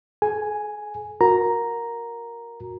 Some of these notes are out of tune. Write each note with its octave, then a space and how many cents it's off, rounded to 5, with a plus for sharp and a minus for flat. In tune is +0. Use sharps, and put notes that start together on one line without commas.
G#4 +45 G#5 +0
F#4 -20 A#4 +0 A#5 +0